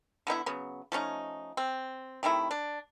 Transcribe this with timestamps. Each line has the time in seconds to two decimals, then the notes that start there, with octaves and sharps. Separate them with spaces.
0.27 D3 B3 D#4 E4
0.46 C#3 F#3 B3
0.92 F3 A3 C#4 D#4
1.57 C4
2.23 C3 D#3 A3 E4
2.51 D4